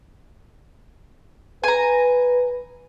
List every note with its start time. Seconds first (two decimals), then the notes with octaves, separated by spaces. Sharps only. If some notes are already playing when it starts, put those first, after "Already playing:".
1.64 B4 G#5 A#5